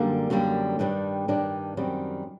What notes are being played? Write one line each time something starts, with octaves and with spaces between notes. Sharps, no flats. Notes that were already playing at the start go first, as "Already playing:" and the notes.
Already playing: F#2 D3 G3 A#3
F#2 D3 G3 A#3
G2 D#3 G3 D4
G2 D#3 G3 D4
F#2 D#3 G3 C4